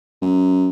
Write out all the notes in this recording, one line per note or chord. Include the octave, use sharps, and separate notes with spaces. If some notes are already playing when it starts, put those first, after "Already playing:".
F#2